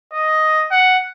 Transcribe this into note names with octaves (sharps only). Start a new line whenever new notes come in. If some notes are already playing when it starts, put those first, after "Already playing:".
D#5
F#5